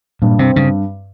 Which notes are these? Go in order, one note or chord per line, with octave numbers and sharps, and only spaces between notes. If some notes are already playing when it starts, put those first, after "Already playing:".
G2 A#2
C3 C4
G2 C#3